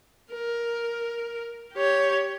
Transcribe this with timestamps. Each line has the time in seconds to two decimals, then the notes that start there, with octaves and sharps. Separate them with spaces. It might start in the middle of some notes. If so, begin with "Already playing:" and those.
0.33 A#4
1.73 G4 C#5